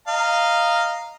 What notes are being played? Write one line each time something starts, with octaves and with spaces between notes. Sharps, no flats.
D#5 F5 A#5